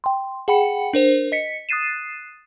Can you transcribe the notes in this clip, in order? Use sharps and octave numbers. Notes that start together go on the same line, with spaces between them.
G5 C6
G#4 F#5 G5 B5 C#7
D4 A#4 C5
D#5 B6 C#7
D#6 F#6 A6 C7 D#7 E7